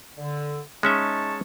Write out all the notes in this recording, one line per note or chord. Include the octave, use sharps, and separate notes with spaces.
D3
G#3 C#4 D#4 E5 A5 C#6